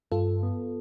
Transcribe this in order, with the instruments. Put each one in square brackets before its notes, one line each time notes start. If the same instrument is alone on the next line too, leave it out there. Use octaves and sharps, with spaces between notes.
[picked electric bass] G2 [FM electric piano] F4 A4
[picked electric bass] B3